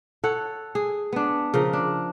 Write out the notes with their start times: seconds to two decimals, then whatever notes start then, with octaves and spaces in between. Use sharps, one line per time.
0.24 A4 C#5 F#5
0.75 G#4
1.13 B3 D4
1.54 C#3 F3 A#4
1.73 D4